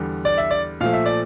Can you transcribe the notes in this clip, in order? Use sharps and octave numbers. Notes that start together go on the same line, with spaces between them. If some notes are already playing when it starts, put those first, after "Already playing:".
Already playing: E2 D3 G3
D5
E5
D5
A#2 F3 A3 F5
E5
D5